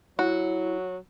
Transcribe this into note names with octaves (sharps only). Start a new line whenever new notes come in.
F#3 E4 F#4